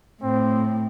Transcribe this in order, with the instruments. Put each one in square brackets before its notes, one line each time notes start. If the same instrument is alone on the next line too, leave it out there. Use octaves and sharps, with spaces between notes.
[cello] A2 [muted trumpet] C4